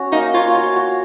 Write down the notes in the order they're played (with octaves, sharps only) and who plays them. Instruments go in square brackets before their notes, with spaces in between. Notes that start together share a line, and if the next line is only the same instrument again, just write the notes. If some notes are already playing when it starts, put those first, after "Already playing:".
Already playing: [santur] C#4 F#4
[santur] A#3 [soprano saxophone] D#4
[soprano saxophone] F4 [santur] C#5
[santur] F#4
F#4